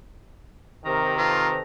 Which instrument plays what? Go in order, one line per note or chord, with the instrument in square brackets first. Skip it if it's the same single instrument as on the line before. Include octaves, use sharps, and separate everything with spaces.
[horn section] C3 D#3 [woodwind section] G4 A#4 C5 [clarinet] A#5
[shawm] F4 [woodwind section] A4 B4 C5